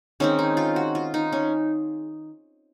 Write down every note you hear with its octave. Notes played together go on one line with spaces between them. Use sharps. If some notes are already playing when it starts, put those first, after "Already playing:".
D#3 G#3 C4 C#4
D#4
F4
F#4
F4
D#4
C#4